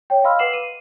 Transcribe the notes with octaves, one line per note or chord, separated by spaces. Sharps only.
C#5 G5
D#5 F5 B5 C6 E6 F6
B4 F#5 D6 C7 E7 F#7
D#7